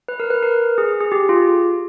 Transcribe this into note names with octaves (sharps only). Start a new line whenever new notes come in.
B4
A#4
B4
A#4
G#4
G#4
G4
F4